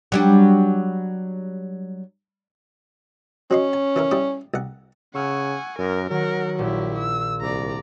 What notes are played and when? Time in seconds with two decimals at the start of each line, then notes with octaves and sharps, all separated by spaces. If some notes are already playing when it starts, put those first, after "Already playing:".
0.12 F#3 G3 D4
3.51 F#3 C#4 D#5 C6
3.73 G#5
3.96 E3 E4 A#4
4.11 G3 E4 D#6
4.54 C2 F#5
5.14 C#3 F#5 G#5 C#6 E6 F6
5.79 F#2 A#4
6.10 D#3 F#3 A#4 F#5
6.59 A#1 E4 G4
6.98 E6
7.41 C2 D5 A#5